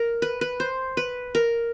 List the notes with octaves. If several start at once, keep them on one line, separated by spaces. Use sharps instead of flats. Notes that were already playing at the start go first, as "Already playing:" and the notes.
Already playing: A#4
B4
B4
C5
B4
A#4